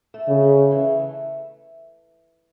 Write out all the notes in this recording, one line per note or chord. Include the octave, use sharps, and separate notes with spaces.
A3
C#3
A3
E3
A3